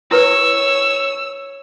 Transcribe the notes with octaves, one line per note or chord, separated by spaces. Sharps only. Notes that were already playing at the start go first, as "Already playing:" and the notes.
E4 A#4 B4 C#5 E6